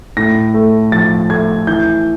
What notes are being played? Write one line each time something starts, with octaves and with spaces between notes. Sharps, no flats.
A2 A#6
A3
F3 A6
A3 G#6
E3 G6